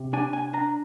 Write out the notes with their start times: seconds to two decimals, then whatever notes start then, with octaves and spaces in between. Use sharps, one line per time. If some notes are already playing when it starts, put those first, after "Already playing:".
Already playing: C3
0.13 D4 G#5
0.33 G#5
0.53 D4 A#5